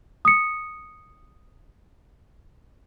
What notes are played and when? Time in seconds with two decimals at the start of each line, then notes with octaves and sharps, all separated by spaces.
0.25 D#6 C#7